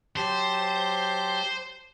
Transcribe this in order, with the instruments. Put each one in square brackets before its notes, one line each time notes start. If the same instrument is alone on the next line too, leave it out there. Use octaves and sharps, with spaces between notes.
[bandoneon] F#3 G4 A5 [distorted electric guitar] C5